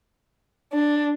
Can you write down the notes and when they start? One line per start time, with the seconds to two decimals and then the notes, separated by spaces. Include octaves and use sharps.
0.73 D4